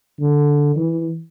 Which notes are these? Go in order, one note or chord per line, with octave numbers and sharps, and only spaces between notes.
D3
E3